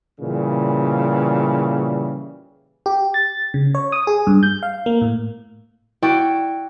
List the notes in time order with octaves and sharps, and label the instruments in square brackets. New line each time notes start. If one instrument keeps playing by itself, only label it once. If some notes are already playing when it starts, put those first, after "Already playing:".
[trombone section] A#2 C#3 E3 G3
[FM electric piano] G4
A6
C#3
C#5
D#6
G#4
G2
G6
F5
A#3
A2
[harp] E4 F#4 D5 G5